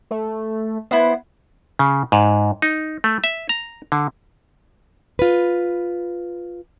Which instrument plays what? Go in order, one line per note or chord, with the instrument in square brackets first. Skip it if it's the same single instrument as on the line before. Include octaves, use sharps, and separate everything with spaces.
[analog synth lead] A3
[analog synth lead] B3 [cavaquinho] E4 C5
[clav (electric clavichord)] C#3
G#2
D#4
A3
E5
A#5
D3
[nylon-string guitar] F4 B4